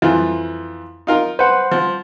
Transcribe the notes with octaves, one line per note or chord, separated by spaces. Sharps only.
F2 E3 F4
D#4 F4 A#4
B4 C5 F#5
F3